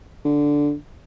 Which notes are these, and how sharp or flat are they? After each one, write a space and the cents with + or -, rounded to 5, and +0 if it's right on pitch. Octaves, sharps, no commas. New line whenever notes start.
D3 -5